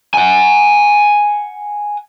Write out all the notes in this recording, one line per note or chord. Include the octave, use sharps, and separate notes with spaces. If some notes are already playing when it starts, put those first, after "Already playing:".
F#5 G#5